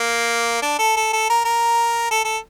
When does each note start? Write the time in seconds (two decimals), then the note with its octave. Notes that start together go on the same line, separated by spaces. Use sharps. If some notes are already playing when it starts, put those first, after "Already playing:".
Already playing: A#3
0.62 D4
0.79 A4
0.96 A4
1.13 A4
1.30 A#4
1.45 A#4
2.11 A4
2.25 A4